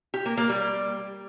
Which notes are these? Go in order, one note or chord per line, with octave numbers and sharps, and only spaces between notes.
G4
A#3
A#3
G3